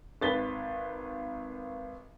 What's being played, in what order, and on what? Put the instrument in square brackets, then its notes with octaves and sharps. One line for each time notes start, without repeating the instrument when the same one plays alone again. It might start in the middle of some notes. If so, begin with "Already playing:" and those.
[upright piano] G#1 B4 A6 B6 G7